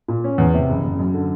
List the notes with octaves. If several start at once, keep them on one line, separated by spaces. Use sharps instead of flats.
A#2
C#4
E2
C3
F#1
F#1
F#2
D3